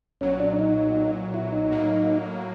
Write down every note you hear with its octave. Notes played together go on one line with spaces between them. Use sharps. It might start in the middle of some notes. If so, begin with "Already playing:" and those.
B1 A#2 F#3 C#4
D4
D#4
E4
D#4
A2 F#3 A#3